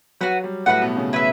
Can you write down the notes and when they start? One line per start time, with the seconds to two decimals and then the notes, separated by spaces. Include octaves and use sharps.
0.21 F#3 F#4 B4 F#5
0.44 G3
0.66 A2 A3 F#4 B4 F#5
0.81 B2 B3
0.97 C#3 C#4
1.13 E4 B4 E5